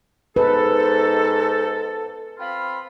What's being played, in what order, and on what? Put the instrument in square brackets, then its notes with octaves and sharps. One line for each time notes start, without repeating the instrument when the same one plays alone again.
[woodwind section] G#2 A4 [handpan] B4
[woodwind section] C4 F4 B5